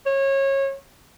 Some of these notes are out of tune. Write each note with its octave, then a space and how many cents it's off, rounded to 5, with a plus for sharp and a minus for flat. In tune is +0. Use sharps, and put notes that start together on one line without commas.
C#5 -25